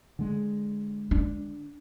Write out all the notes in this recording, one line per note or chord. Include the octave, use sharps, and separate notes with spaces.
D3 G#3
D4